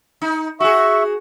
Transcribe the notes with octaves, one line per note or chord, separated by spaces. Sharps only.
D#4
F#4 G#4 E5 C#6